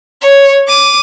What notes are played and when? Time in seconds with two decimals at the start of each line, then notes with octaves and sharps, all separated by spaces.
0.21 C#5
0.68 D6 D#7